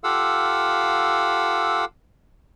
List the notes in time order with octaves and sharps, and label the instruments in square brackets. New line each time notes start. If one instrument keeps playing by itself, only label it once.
[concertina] F4 G4 A4 F5 F#5 E6